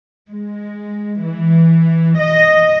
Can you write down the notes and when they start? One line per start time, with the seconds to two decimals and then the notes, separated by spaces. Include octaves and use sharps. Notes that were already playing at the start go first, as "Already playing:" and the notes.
0.30 G#3
1.22 E3
2.20 D#5